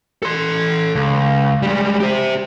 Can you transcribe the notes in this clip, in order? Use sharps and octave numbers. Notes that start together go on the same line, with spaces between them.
A4 C6
C#2
G3 G#3
G4 C5